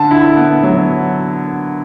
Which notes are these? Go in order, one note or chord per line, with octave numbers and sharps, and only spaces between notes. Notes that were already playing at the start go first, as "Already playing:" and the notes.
Already playing: D3 A5
E4
B3
F#3